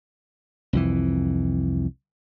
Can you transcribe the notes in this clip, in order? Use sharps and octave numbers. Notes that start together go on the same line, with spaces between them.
C2 F2 E3